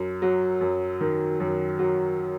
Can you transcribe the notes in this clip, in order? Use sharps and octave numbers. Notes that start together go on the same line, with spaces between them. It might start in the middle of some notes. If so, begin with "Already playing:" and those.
Already playing: F#2
F#3
F#2
D#3
F#2
F#3